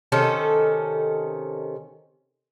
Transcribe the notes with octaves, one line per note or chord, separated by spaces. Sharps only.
C3 D#3 C#4 A4